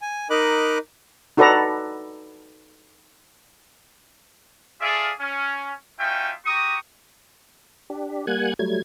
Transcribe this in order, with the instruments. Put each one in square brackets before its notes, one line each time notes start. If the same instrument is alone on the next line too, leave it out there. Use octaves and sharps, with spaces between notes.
[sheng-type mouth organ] G#5
D#4 A#4 D#5 B5 D6 F#6
[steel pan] D#4 F#4 A4 B4 D5 A#5
[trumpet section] F4 G#4 A4 D5 E5 F5
C#4
C#4 D#4 F4 F#4 E5 G5
F#4 G4 A#5 C#6 D#6
[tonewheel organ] D4 G4
G3 A#3 F#5 G#5 F#6 G#6
F#3 G3 A3 G#6